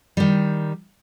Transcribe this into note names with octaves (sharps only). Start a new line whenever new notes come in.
D#3 G3